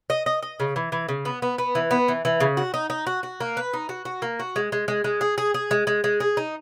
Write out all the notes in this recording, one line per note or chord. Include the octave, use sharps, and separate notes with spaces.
D#5
D#5
D#5
C#3
E3
E3
C#3
B3
B3
B3
E3
B3
E3
E3
C#3
F#4
D#4
D#4
F#4
F#4
A#3
B4
D#4
F#4
F#4
A#3
F#4
G#3
G#3
G#3
G#3
G#4
G#4
G#4
G#3
G#3
G#3
G#4
D#4